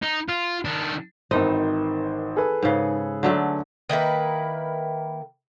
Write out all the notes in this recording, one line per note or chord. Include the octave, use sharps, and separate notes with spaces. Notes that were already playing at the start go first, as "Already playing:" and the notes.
D#4
F4
D#3 D4
G#1 D#3 E3 D#4 C5 D#5
G#4 A4 B4
G#2 C#3
D3 F#3 A3
D#3 A#3 E4 B4